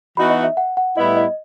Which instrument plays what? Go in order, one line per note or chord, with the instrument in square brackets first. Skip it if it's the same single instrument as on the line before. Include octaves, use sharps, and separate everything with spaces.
[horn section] E3 B3 D#4 F#4 [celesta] B5
[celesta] D#5
E5
F#5
F#5
[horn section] A2 G3 B3 E4 [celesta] D#5
[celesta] D#5